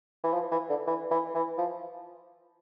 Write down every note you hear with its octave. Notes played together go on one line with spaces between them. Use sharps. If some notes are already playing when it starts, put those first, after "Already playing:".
E3
F3
E3
D3
E3
E3
E3
F3